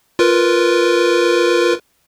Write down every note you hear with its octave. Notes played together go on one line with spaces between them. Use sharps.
F4 A#4 B4